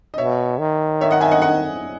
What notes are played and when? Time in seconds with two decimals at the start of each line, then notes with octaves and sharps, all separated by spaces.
0.14 D#5
0.18 B2 C#5 E5
0.59 D#3
1.01 C#5 E5
1.11 D#5 F#5
1.21 E5 G#5
1.31 D#5 F#5
1.42 D#5 F#5